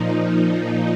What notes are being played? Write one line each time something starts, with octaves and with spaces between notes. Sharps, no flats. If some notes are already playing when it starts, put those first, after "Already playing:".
Already playing: A#2 F3 D#4